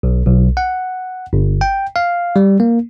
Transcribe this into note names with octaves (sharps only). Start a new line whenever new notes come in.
B1
B1
F#5
G1
G5
F5
G3
A#3